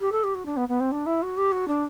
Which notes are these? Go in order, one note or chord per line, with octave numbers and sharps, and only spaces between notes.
G4
A4
G4
F#4
D4
B3
B3
C4
D4
E4
F#4
G4
F#4
D4